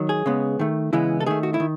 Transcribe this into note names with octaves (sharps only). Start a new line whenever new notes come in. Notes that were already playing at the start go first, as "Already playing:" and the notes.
Already playing: D#3 F#3
G#4
C#3 G#3 B3
D#3 A3
C#3 E3 G#3 B3 E4
A4
D#3 A3 G#4
F#4
E4
D#3